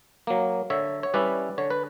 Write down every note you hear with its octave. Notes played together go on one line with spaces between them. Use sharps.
F#3 A#3
D3 C#5 E5
C#5
G3 C#4 E4 B4 D5
D3 C#5
B4